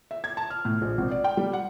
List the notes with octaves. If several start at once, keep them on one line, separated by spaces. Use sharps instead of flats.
E5
G#6
A5
F6
A2
A#1
G#1
D5
G5
G3
F#5